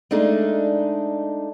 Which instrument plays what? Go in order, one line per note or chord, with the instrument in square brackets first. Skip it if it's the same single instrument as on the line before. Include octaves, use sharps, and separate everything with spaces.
[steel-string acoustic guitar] G#3 A3 D4 D#4